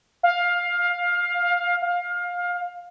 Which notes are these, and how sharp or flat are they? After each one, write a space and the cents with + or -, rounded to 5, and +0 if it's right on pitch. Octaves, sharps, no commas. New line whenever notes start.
F5 +15
F5 +20